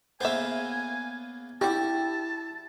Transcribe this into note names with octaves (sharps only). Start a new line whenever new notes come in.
C#3 A#3 B3 C5 E5 G#5
D4 E4 F#4 G4 A5